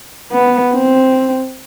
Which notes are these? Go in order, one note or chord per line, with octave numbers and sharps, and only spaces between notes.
B3
C4